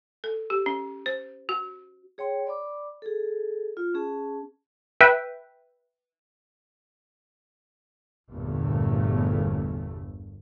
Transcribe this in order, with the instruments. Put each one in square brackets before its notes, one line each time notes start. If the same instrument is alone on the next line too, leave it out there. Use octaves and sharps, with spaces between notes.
[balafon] A4
G4
C#4
C5
F#4
[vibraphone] G#4 C#5 G5 C6
D5 B5 D6
G#4 A4
F4
C#4 G#4 A5
[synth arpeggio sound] B4 E5 G5
[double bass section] G1 E2 A#2 G3 A3